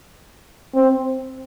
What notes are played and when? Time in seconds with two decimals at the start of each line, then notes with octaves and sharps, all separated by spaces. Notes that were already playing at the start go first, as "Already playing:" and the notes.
0.75 C4